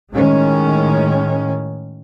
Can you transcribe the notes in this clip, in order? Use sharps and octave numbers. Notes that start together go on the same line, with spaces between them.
A2 D#3 G#3 C#4